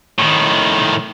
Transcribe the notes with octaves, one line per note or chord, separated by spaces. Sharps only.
A2 D#3